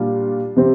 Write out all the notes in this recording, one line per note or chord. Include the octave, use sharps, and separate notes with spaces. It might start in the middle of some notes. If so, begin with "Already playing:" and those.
Already playing: A#2 G3 D4 F4
C3 G3 C4